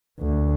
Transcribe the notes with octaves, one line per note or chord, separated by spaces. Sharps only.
D2